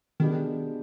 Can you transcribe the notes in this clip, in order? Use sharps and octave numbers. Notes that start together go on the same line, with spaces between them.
B2 D#3 G#3 B3 D4 G4